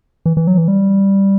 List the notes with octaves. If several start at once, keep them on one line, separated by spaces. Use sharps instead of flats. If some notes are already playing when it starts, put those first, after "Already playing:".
E3
E3
F#3
E3
G3